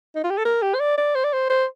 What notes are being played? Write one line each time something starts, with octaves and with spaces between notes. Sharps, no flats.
D#4
F4
G4
A4
A#4
G4
C5
D5
D5
C5
D5
C5
C5